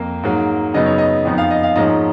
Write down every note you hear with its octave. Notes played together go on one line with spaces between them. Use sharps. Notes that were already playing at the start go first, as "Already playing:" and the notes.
Already playing: F2 A#3
G#2 F#3 A#3
F#2 C#3 F#3 B3 D#4 D#5
C#5
D#5
F2 F3 B3 D#4
F5
D#5
F5
G#2 F3 A#3 C#4 D#5